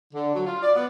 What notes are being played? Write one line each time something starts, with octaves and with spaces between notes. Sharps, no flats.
D3
F#3
F4
D5
B3